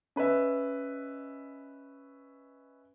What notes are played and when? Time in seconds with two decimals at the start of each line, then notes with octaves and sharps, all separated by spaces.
0.16 C#4 B4 D#5 E5